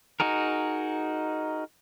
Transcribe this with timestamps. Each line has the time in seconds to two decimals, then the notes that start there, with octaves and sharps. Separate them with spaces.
0.20 D#4 F#4 G#4 A#4